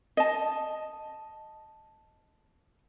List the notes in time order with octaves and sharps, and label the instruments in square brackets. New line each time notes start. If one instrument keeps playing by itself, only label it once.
[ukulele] D#5 A5